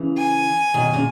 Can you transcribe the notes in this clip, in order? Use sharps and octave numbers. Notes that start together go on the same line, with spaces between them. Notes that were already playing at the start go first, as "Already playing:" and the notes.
Already playing: C#3 E3
G#5
B2 D#3
A#2 C#3